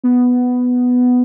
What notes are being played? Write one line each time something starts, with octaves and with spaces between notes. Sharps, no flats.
B3